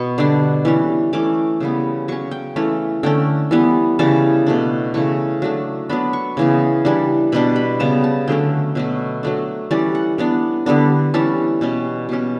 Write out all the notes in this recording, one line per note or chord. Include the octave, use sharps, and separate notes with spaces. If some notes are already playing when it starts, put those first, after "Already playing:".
Already playing: B2 B3 C#6
D3 G3 D4
E3 G3 C#4
E3 A3 C#4 D6
C#3 G3 B3
F#3 C#4 C#6
G5
E3 A3 C#4
D3 A3 C#4 G5
E3 G3 B3
C#3 E3 G3 C#4 A5
B2 A3 D4
C#3 E3 A3 C#6
F#3 A3 D4
F#3 B3 D4 B5
C#6
C#3 E3 B3
E3 G3 D4
B2 G3 D4 B5
B5
C#3 G3 B3 A5
A5
D3 F#3 A3 C#4 G5
B2 F#3 A3
F#3 A3 D4
E3 G3 C#4 D5
F#5
E3 B3 D4
D3 G3 B3 D4
E3 G3 C#4 A5
B2 G3 C#4
B2 G3 C#4